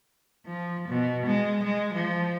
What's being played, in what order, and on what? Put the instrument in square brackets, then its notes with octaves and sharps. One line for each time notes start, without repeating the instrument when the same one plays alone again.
[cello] F3
B2
G#3
G#3
F3